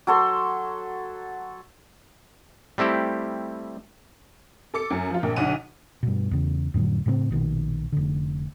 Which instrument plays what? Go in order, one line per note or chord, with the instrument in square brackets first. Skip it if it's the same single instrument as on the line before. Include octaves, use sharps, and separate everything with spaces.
[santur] F#3 A4 C6
[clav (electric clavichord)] G3 A3 C4 E4 G4
[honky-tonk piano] A4 D6 C#7
F#2
F3 F4
A#1 A#3
B1 D3 F#5 D#7
[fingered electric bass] G2 B2
E2 C#3
F2 A2 D3 F#3
A2 C#3 A#3 C4
A#1 B2 D#3
F1 D3